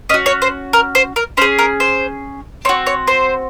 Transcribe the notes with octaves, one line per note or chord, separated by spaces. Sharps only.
C#4 F#4 D#5
C#5
C5
A#4
C5
A#4
C#4 G#4 C5
A#4
C5
C4 F#4 C#5
C#5
C5